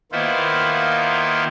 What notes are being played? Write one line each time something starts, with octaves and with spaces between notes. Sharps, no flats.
D#3 A#3 B3 E4 F4 C5